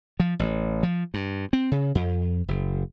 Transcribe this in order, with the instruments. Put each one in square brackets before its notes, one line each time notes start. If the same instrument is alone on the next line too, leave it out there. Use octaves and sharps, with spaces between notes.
[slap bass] F3
A1
F3
G2
C4
C#3
F2
F#1